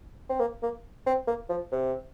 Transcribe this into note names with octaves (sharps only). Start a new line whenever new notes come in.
C4
A#3
A#3
C4
A#3
F3
C3